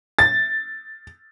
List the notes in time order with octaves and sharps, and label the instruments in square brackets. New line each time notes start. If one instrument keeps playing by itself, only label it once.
[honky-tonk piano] A6